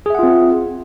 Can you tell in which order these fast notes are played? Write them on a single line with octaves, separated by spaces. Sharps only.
G#4 E5 F#5 F4 C4